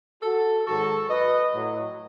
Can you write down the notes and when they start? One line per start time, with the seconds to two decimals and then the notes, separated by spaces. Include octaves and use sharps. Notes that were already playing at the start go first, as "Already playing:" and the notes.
0.22 F#4 A4
0.66 G#2 D#3 F#3 F#4 A4
1.10 B4 D#5
1.54 A2 F#3